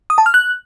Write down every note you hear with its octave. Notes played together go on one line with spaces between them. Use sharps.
D#6
A5
F6
F#6